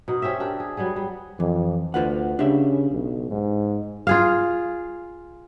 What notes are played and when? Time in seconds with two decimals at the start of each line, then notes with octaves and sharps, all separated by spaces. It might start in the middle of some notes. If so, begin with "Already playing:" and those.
0.08 B2 D#4
0.22 C#4 G4 C5 E5
0.40 D4 G4 A#4
0.60 G#4
0.77 F#3 G3 B3 G#4
0.96 G3
1.40 F2 E3
1.94 D2 F4 B4 F#5
2.39 C#3 D4 G4 E5
2.91 B1
3.30 G#2
4.07 F4 G#4 F5